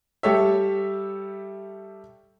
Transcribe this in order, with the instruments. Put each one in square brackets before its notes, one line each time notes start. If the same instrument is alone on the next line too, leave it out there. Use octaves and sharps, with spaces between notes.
[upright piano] G3 G4 A4 C#5 E5